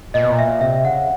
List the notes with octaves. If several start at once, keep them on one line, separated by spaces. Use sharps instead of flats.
A#2 D#5
B2
A#2
E5
C3 E5
C#3 F#5